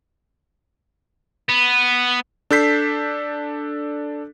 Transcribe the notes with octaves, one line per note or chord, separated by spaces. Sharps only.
B3
D4 A4 G6 B6 C7